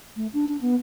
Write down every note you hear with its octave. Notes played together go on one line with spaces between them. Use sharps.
A3
D4
D4
B3